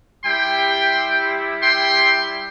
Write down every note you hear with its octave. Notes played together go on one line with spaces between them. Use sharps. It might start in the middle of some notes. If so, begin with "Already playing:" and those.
G3 E4 G4 G5 C6
G5 C6